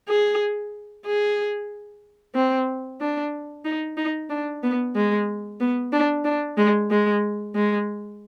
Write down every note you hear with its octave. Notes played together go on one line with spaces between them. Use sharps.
G#4
G#4
C4
D4
D#4
D#4
D4
B3
G#3
B3
D4
D4
G#3
G#3
G#3